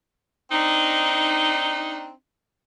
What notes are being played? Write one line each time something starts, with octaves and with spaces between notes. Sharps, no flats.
C4 D4 D#4